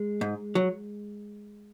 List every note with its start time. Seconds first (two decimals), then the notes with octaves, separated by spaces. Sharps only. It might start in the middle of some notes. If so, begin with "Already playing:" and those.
Already playing: G#3
0.21 G#2
0.55 F#3